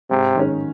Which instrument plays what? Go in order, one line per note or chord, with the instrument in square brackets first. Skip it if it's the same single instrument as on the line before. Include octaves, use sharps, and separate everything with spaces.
[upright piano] G#2 [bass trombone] C3
[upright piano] D#3 G#3 C#4